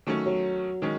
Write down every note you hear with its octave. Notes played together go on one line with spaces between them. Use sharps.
D#3 F#3 A3 C#4
F#3
D#3 G#3 C#4